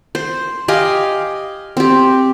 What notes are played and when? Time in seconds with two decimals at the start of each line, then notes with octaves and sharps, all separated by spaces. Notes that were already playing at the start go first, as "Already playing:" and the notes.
0.15 C5
0.68 G4 D#5 F5 G#5
1.77 C4 G4